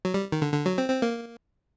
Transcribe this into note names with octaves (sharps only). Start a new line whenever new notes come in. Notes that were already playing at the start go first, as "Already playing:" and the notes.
F#3
G3
D#3
D3
D3
F#3
C4
C4
A#3